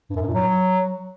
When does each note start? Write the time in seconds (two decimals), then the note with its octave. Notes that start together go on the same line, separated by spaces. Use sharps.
0.10 G2
0.16 F#2
0.22 G2
0.28 A#2
0.34 F#3